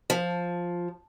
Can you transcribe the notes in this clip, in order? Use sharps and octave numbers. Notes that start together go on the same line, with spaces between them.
F3